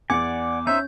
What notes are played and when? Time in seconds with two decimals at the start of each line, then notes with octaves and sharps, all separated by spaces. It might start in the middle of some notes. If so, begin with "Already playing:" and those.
0.10 E2 D5 F#5 G#5 D6 C#7
0.67 C#4 D#4 C5 E5 G6